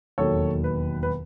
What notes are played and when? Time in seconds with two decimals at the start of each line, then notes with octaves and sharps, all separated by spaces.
0.18 E1 D#2 D#3 F#3 A4 C#5
0.64 B4
1.03 B4